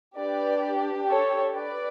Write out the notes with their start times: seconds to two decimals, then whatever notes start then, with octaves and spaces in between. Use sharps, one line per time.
0.18 D4 G4 B4 D5
1.09 A4 C#5
1.54 B4 D5